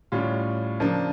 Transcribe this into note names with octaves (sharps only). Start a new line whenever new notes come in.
A2 G3 C#4 F4
C#3 F3 A#3 D4